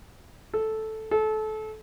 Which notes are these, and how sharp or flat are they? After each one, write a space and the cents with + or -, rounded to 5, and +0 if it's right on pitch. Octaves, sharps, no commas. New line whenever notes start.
A4 -5
A4 -25